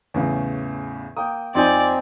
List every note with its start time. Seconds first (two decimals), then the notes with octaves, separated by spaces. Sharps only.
0.14 E2 A2 C#3
1.17 A#3 G5 D#6
1.55 F2 C4 D#4 C5 D5 D#5 G#5 G6